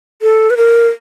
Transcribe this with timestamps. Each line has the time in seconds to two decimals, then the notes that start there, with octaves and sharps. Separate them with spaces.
0.22 A4
0.50 B4
0.57 A#4